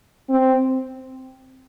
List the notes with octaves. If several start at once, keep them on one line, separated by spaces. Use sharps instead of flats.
C4